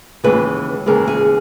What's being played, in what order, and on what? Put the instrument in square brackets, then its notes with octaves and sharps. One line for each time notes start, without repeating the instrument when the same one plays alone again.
[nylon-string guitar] D#2 C#3 E3 G#3 B4
D#2 C#3 E3 G#3 A#4
G#4